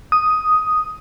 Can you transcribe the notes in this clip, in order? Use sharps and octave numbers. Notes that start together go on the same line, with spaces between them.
D#6